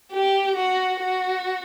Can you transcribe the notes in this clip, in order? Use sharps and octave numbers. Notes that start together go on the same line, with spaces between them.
G4
F#4
F#4